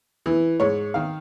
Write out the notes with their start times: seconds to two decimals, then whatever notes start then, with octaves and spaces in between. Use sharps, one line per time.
0.26 E3
0.60 G#2 C#5
0.94 D#3 F5